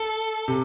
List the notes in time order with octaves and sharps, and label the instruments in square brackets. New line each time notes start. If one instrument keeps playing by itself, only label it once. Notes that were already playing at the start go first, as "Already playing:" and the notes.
Already playing: [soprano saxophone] A4
[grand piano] C3